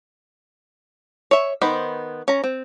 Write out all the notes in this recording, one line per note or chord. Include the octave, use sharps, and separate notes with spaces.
C#5 E5
D#3 B3 C5 B5
C#4 A#5
C4